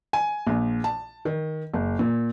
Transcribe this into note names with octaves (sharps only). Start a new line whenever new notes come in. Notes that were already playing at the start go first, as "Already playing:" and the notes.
G#5
A#1
A5
D#3
F#1
A#2